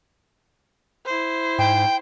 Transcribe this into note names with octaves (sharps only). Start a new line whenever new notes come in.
E4 C5
G#2 G5